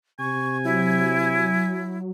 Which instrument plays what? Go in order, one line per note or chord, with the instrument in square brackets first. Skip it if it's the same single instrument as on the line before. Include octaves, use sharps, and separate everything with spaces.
[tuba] C3 [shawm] G#5 [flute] C#6
[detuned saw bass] F#3 [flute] E4